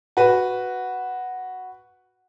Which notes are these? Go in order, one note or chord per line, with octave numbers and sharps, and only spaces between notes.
F#4 B4